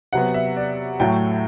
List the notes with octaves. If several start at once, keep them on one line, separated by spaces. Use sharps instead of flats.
C3 F#3 B3 F#5
E5
D5
A2 F#3 A3 G5